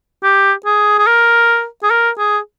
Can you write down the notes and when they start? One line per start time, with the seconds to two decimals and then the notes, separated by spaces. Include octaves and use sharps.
0.24 G4
0.66 G#4
0.99 G#4
1.07 A#4
1.83 G#4
1.91 A#4
2.18 G#4